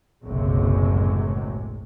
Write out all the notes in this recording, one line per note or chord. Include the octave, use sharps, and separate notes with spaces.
F#1 B1 A2 C3 F#3 G#3